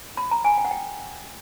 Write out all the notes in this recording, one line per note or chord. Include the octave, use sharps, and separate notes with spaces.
B5
A#5
G#5
G5
F#5
G5